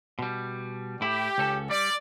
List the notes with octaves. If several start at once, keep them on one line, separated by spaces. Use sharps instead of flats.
B2 G3
A2 E4 G4
C#2 C#4 A4
G3 D5